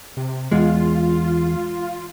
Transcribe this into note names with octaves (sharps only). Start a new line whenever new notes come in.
C3
E2 G#3 F4